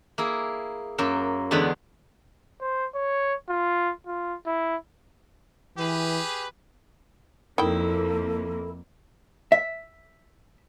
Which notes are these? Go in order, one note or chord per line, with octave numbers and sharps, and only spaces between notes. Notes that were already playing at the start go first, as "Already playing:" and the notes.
A#3 E4 G#4
F#2 A#3 E5
E2 D3 G#3 B3 G#4 B5
C5
C#5
F4
F4
E4
E3 G4 G#4 B4
F2 D#3 A#3 E4 A4 G5
E5